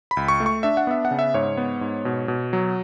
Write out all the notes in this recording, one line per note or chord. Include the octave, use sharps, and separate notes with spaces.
B5
C#2
C#6
A3
C#6
D4 E5
F#5
B3 E5
F#5
C#3
E5
G#2 C#5
B3
G#2
B2
B2
F#3